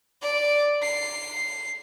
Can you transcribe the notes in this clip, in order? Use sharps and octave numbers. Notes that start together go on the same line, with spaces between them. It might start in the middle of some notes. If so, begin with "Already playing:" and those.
D5
C7